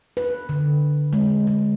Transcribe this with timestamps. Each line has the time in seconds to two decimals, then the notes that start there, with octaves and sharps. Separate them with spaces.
0.17 B4
0.49 D3
1.13 G#3
1.47 G#3